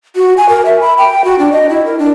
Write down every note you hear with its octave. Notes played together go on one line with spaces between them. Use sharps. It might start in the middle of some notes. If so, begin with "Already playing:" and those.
F#4
G#5
A#4
E5
B5
G5
F#4
D4
D#5
E4
A#4
D4